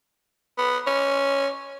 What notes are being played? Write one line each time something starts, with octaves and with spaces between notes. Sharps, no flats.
B3
C#4